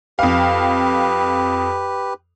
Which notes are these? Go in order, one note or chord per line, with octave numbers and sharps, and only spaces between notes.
F2 G4 B4 F5